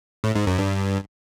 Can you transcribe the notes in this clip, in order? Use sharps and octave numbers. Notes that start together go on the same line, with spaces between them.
A2
G#2
F#2
G2